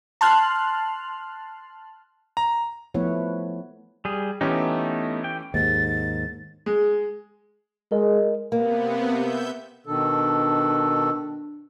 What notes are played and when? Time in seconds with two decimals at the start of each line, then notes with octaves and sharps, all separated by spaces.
0.21 A5 C6 F6 F#6
2.37 A#5
2.94 F3 A3 B3 E4 B4 C#5
4.05 G3 G#4
4.41 E3 A3 B3 C#4 D#4 G4
5.24 G5
5.54 D#2 G#2 A6
6.66 G#3
7.92 G#3 A#4 D#5
8.52 C3 A#3 B3
9.11 E5 G6
9.86 B2 D#3 D4 A4